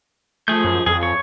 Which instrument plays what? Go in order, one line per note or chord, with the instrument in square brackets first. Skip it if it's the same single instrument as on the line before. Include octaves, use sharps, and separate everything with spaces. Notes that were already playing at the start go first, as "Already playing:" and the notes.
[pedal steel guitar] F3 G#4 G6 [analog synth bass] A3
[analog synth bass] F#2
[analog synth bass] F2 [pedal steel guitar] G#4
[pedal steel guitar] C#5